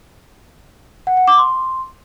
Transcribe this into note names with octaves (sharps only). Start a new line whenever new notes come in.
F#5
F#5
D6
C6